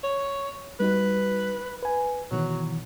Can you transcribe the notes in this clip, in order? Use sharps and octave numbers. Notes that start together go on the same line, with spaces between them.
C#5
G3 D#4 F#4 B4
B4 G#5
B2 D#3 E3 F#3